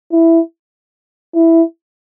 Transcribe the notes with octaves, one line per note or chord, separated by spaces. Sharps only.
E4
E4